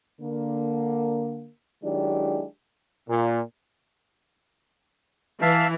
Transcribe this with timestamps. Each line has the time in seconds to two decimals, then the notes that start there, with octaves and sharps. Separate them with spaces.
0.21 D3 A#3
1.83 D#3 F#3 G#3 D4 E4 G4
3.09 A#2
5.42 E3 E5 F5 A5